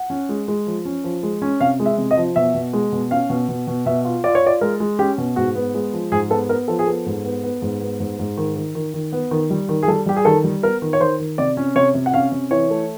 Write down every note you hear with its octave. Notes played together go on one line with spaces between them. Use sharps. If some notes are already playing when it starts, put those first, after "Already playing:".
Already playing: F#5
C#4
G#3
G#3
F3
C#4
F3
G#3
C#4
C3 F5
G#3
E5
C3
D#5
F3
B2 E5
B2
G#3
B2
C#4 F5
B2
B2
B2
B2 E5
F4
F4 D5
C#5
F4 D5
G#3 A#4
G#3
C#4 G4
B2
G#2 F#4
B3
G#3
F3
G#2 G#4
B3 A4
B3 A#4
F3 A4
G#4
B3 A4
G#2
B3
B3
G#2
B3
G#2
G#2
D#3
D#3
D#3
D#3
B3
D#3
G3
D#3
G#4
G3 A4
G3 G4
G#4
D#3 A4
G3
B3 A#4
D#3
C#5
D#3 C5
D#3
C3 D5
C#4
C3 C#5
C3
F#5
C#4 F5
C3
E3 C#5
A3